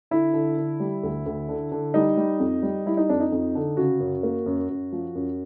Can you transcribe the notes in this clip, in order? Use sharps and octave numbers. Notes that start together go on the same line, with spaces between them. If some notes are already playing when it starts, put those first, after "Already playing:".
D3 E4
D3
D3
G3
D2
D2
D3
D3
G3 D#4
G3
F2
G3
G3 E4
D#4
F2 D4
D#4
F2
D3
C#3 F#4
F#2
A#3
F#2
F#2
F3
F#2